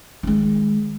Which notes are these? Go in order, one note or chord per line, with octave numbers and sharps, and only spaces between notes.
D#3 G#3